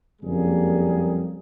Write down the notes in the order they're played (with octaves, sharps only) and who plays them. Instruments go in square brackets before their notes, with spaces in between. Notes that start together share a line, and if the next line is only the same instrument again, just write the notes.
[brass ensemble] F#1 F2 G3 A#3 G#4